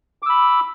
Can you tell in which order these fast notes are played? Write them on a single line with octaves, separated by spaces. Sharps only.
D6 E6 B5